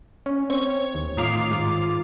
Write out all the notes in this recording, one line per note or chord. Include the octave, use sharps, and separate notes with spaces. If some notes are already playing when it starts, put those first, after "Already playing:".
C#4
C4 C#5
D#2
A2 D#3 F4 D6
G#2